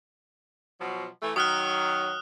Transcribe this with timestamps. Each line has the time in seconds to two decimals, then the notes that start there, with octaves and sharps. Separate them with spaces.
0.79 B2 F3 F#3
1.21 E3 A3
1.36 D#3 F#3 D#6 F6 F#6